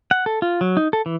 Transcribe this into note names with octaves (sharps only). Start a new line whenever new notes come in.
F#5
A4
F4
F#3
D#4
A4
E3